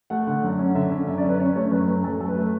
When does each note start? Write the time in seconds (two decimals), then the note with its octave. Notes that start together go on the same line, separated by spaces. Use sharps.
0.10 A3 F#5
0.27 D3 F#5
0.43 F#2
0.59 C#4
0.75 D3 E5
0.91 C#4
1.07 F#2 E5
1.18 D5
1.24 C#4
1.29 B4
1.39 C#4 C#5
1.56 A3 C#5
1.71 F#2 B4
1.87 F#2 B4
2.04 F#2 A4
2.20 A3 A4
2.28 B4
2.36 A3